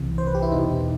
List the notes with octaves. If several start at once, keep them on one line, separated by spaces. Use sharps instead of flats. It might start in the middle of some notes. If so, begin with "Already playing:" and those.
Already playing: C2 C3 E3
C5
B4
G4
E4
E2 B2 D#4